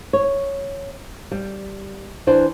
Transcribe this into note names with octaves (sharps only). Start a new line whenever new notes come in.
C#5
G3
E3 D4 C5